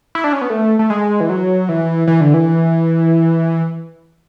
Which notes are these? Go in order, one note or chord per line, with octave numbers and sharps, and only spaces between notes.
E4
D4
C#4
B3
A3
A3
G#3
E3
F#3
E3
E3
D3
E3